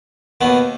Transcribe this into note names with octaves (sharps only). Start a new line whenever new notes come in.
D#2 B2 D#3 B3